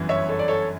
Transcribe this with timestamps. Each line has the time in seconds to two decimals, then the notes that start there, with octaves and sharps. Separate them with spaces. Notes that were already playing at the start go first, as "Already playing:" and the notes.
Already playing: G1 F#2 E3
0.09 C#5 E5
0.29 A4 C#5
0.39 D5
0.48 A4 C#5